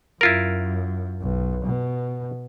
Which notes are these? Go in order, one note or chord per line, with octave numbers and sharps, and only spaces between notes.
F#2 E4 F4 A#4
B1
B2